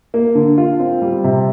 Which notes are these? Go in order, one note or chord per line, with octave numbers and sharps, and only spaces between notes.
A#3
D3
F4
C4
G3
C3